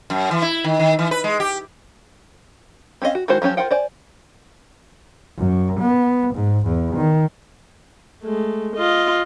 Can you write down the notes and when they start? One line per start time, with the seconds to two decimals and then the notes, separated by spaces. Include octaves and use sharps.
0.10 F#2
0.31 E3
0.42 E4
0.64 D#3
0.80 D#3
0.99 E3
1.11 B4
1.24 G#3
1.40 G4
3.02 C4 C#4 F#4 D#5 F5
3.15 F#4
3.28 D#3 G#3 E4 F#4 C5
3.42 F3 F#3 C#4 G4
3.57 F4 A#4 C5 F#5 G5
3.71 C5 D5 G#5
5.37 F#2
5.81 B3
6.35 G#2
6.67 E2
6.97 D#3
8.24 G#3 A3
8.76 F4 D#5